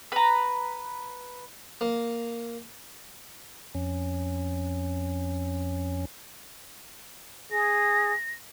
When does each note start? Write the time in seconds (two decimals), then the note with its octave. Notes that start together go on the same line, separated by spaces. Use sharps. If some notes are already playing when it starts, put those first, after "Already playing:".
0.12 B4 A#5
1.81 A#3
3.75 F2 C#4
7.52 G#4 A#6